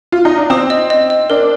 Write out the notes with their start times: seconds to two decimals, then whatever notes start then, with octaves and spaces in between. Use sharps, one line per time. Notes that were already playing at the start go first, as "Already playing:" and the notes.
0.12 F4
0.25 D#4
0.37 D4
0.50 C4 D#6
0.70 D#5
0.90 D#5
1.10 D#5
1.30 D4 A#4